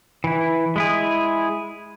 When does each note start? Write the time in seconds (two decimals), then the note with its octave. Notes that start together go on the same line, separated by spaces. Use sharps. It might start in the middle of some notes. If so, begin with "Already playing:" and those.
0.24 E3 E4
0.76 G#3 E4 G#4